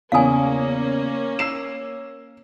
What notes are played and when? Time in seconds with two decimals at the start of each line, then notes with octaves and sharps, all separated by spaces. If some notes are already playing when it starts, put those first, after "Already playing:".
0.12 E2 C#3 A#3 C#4 F5 G#5 D#6
1.39 E6 C7 E7